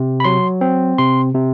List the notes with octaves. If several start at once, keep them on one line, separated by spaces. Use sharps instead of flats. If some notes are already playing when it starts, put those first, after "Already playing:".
Already playing: C3
B5
F#3 C6
C4
C3 C6
C3